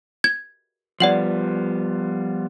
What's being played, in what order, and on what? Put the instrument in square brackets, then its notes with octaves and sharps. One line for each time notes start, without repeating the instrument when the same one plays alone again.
[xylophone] G#6
[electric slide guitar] F3 G3 B3 [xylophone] D5 F#5 F#7